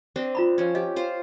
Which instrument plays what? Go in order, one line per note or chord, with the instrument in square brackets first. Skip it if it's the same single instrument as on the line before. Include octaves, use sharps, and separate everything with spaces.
[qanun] C4 D4 D#5
[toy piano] F4 A#5 B5
[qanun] F3 C#4
[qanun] G4 [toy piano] D#5
[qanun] F4 C5